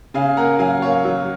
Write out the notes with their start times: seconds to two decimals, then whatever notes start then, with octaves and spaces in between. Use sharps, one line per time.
0.14 C#3 F5 G#5
0.37 A#3 F#5 A#5
0.59 F#3 F5 G#5
0.82 A#3 C#5 F5
1.05 F#3